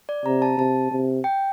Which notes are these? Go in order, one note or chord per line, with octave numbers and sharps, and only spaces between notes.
D5
C3 A#5
A5
C3 A5
C3
G5